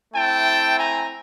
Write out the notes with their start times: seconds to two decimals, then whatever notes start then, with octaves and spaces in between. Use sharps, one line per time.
0.14 A3 C4 E4 G5 A5
0.77 G#5 A#5